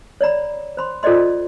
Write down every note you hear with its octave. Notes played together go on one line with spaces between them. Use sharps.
C#5 D5 A#5 B5
C5 B5 C6
F4 A4 C5 D5 D#5 C6